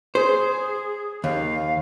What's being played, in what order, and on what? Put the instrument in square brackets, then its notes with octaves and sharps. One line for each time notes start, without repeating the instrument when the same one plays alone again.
[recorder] G#4 [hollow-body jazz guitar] C5
[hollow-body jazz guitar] D#2 [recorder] F5